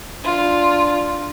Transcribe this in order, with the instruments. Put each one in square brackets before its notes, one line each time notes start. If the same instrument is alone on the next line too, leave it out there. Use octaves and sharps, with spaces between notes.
[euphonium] D4 [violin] F4